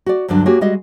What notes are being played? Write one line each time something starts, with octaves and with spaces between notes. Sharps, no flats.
F#4 D5
D2 G2 D3 F#3 D4
A#3 F#4 G4 C#5 G#5
G3 G#3 F#4 D#5